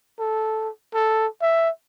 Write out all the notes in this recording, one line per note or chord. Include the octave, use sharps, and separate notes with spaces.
A4
A4
E5